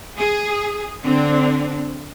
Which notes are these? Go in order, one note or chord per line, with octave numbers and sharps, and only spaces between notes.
G#4
D3 C4 D4